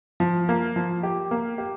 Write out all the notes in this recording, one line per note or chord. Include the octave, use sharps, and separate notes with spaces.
F3
A#3
F3
G4
A#3
G4